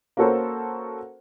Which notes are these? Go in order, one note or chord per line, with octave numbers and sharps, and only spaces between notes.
A#3 C#4 F#4 A4 A#4 C5